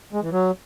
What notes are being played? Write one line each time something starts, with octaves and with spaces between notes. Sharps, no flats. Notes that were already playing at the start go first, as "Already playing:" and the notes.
G#3
E3
F#3